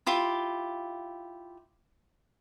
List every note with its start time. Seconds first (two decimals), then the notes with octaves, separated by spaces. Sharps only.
0.07 E4 F4 G4